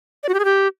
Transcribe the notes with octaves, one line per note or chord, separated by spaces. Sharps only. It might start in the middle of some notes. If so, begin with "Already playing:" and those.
D5
F#4
G4
G#4
G4